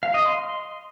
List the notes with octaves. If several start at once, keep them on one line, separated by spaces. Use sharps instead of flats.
F5
D#5
C6